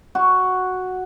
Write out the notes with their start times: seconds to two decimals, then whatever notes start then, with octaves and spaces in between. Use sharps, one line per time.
0.15 F#4